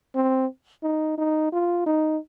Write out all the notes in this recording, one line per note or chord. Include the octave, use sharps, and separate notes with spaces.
C4
D#4
D#4
F4
D#4